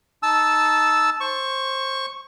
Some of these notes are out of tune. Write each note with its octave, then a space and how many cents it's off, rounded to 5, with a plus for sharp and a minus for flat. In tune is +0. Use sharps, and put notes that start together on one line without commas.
D#4 +0 A5 -10 E6 +0
C5 +20 C#6 +0